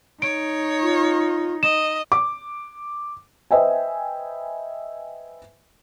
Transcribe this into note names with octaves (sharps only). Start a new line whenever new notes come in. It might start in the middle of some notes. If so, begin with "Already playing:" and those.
D#4 C#5 D7
F4
D#5 E7
D6
B4 C5 D#5 E5 G5 G#5